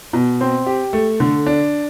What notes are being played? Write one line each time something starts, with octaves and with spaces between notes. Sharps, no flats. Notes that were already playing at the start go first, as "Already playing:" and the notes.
B2
C4
G4
A3
D3
D4